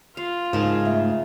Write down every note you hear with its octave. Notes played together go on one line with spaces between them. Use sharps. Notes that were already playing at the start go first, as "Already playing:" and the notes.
F4 F5
G#2 C#3 A#4 A5
A3